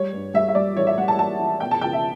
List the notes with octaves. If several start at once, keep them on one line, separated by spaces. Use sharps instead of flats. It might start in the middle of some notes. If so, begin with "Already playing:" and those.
Already playing: G3 C#5
G2
G3 E5
E5
G3 D5
A1 C#5
E5
G3 F#5
A5
E3 A5
E3
B2 G5
A5
C#2 G5
E5